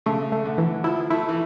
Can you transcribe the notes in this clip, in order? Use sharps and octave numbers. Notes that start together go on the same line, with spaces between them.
C#3 A3
A3
D3
E3
F3 E4
A3 E4
E3